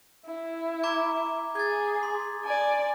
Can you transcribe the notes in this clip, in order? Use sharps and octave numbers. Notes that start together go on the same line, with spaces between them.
E4
A#5 D6 G#6
G#4 G#6 A6
C6
D5 G#5